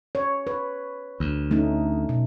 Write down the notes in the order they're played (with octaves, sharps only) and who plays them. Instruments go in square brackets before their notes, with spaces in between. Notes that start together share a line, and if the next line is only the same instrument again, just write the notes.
[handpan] C#5
B4
[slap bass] D2
[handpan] A3 C#4 D#4
B2